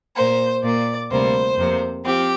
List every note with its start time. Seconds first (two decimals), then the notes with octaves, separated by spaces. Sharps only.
0.16 A#2 A#3 C5
0.63 A#2 A#3 D5
1.10 D2 C3 G3 A#3 C5
1.57 F2 C3 A#3
2.05 F3 C4 G4